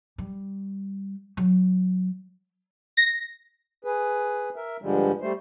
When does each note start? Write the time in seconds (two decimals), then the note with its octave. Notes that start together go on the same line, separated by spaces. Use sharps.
0.18 G3
1.37 F#3
2.97 A#6
3.85 G#4 B4
4.56 A#4 E5
4.82 G2 D3 F3 G3 G#3
5.22 G3 A3 C5